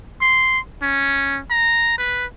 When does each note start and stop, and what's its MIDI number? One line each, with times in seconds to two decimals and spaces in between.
0.21 0.59 84
0.82 1.40 61
1.50 1.98 82
1.98 2.26 71